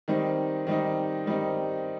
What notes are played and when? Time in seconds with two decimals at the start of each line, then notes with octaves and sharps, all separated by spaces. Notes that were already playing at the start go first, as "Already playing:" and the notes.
0.08 D#3 G3 C4 D#4
0.67 D#3 G3 C4 D#4
1.26 D#3 G3 C4 D#4